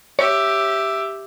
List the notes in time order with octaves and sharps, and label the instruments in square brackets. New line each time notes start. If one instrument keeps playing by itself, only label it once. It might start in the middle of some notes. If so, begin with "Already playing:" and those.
[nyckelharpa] G4 E5 [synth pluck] C#5